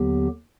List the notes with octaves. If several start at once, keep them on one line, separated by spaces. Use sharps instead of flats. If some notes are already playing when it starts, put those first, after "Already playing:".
Already playing: D#2 D3 F#3 B3 G4